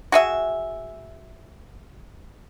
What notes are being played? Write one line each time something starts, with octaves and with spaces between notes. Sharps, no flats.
F#4 G#4 E5